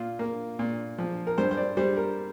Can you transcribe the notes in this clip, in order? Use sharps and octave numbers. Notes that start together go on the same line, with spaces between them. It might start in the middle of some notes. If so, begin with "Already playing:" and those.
Already playing: A#2 F4
A#3
A#2
F3
A#4
G2 C5
C5
D5
G3 C5
A#4